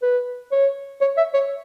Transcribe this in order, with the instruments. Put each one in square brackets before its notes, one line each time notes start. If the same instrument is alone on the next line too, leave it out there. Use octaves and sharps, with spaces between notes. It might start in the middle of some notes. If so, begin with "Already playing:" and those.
[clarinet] B4
C#5
C#5
E5
C#5